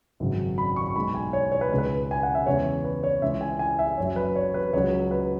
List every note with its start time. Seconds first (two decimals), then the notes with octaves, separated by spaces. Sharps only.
0.20 G#1 F#2 C#3 F#3
0.58 B5
0.76 C#6
0.96 B1 B2 G#3 B5
1.15 G#5
1.33 C#5
1.52 C#5
1.61 B4
1.71 C#2 C#3 G#3
1.78 B4
2.11 G#5
2.23 F#5
2.35 E5
2.46 E2 C#3 G#3 C#5
2.84 B4
3.03 C#5
3.22 C#2 C#3 E3 G#3 E5
3.41 G#5
3.59 G#5
3.79 E5
3.98 F#1 F#2 F#3 C#5
4.16 B4
4.36 C#5
4.54 B4
4.73 C#2 C#3 F#3 C#5
5.11 B4